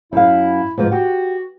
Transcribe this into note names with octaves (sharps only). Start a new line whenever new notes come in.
F#2 E4 F5
G#2 B2 F3
F#4 G4